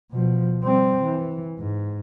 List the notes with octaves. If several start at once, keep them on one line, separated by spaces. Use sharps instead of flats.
B2 F3
G3 C4
E3
G#2